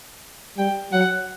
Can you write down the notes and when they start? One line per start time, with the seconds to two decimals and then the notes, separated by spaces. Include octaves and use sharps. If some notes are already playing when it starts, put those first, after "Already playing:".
0.57 G3 G5
0.92 F#3 F#5